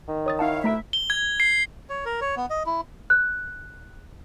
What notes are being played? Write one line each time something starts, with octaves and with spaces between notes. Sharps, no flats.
D#3
C#5 D#6 A6
D#4 E4 C#5 F5 F#5 A5
D2 A3 E4 E5 A#5 D7
G7
G#6
C7
C#5
A#4
C#5
B3
D#5
E4
F#6